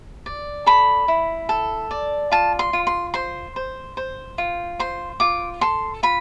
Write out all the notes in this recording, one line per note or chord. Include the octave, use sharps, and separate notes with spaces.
D5
A4 B5
E4
A4
D5
F4 A5
C6
F4
C6
C5 C6
C5
C5
F4
C5 C6
F4 D6
A4 C6
F4 B5